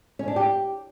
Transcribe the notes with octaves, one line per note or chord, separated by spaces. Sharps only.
C#4
D4
G4